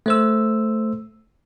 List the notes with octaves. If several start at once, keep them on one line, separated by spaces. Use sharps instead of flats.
A3 C5 E6